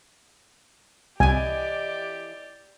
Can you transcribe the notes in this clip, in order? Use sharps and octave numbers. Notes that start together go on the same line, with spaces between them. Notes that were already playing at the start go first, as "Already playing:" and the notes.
C2 E3 G4 D5 D#5 G#5